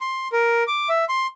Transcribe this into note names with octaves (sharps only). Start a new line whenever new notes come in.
C6
A#4
D6
E5
C6